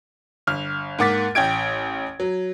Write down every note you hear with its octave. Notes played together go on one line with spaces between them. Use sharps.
G1 F6 F7
G#2 A#3 F#5 D6 A6 B6
A1 G5 G#6 D7
F#3